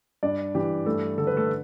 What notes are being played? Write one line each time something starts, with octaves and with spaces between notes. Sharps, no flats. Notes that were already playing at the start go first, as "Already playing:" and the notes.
G2 D4 D5
E3 G4
G2 A3 A4
D3 A4
B4
A3 A4